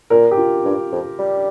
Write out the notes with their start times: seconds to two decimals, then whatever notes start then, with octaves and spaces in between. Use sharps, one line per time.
0.10 A#2 A#4
0.31 G4
0.37 F4
0.65 G2
0.92 F2
1.19 G3